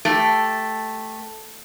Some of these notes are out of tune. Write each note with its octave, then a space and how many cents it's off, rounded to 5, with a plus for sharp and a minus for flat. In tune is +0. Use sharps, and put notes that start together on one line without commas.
A3 +0 G4 +0